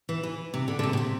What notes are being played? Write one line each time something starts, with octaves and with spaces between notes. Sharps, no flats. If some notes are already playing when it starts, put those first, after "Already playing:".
E3
E3
C3
D3
D3
C3
B2
C3